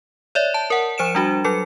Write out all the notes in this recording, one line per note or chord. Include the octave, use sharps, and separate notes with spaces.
C#5 D5 E5
A5
A#4 F#5
F3 C5 C#7 D7 E7
G3 D4 F#4
F#3 A4 C#7